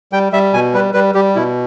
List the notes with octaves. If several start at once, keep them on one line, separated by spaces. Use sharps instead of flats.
G3 G5
G3 E5
B2 G#5
G3 B4
G3 B4
G3 G4
B2 E4